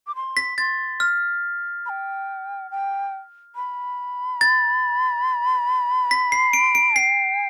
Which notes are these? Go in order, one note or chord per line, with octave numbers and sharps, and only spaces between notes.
D6
C6
B6
C6 A6
F6
B5
G5
G5
B5
A6
B6
C7
D7
D7
G5 C7